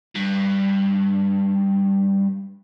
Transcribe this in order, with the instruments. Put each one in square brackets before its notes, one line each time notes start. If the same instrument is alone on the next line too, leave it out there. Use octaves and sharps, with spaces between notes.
[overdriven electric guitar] G2